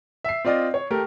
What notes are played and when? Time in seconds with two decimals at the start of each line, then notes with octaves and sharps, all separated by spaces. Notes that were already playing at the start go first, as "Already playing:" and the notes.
0.24 E5 C7
0.45 C4 F4 D5 D#5
0.74 C#5
0.91 A3 G4 A#4